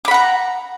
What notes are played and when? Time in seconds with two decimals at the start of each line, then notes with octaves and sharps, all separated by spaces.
0.05 D6
0.08 B5
0.11 F#5
0.14 A#5